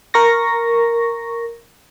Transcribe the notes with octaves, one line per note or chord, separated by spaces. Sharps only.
A#4 C#6 A#6